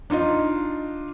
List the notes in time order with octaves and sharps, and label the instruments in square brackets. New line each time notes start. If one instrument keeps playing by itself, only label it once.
[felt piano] D4 D#4 F4 D#5